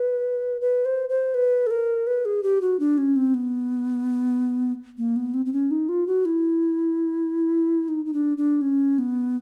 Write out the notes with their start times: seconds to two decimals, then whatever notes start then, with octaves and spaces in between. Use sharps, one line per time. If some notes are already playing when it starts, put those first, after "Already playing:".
Already playing: B4
0.61 B4
0.85 C5
1.09 C5
1.35 B4
1.67 A4
1.71 A#4
2.07 B4
2.25 G#4
2.43 G4
2.61 F#4
2.80 D4
2.98 C#4
3.16 C4
3.34 B3
4.98 A#3
5.16 B3
5.34 C4
5.46 C4
5.53 C#4
5.71 D#4
5.89 F4
6.07 F#4
6.25 E4
7.88 D#4
8.06 D#4
8.13 D4
8.38 D4
8.61 C#4
8.98 B3